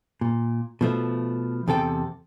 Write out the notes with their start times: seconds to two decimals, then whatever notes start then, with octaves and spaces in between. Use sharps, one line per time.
0.21 A#2
0.81 B2 F3 A3
1.68 E2 C3 A4 G5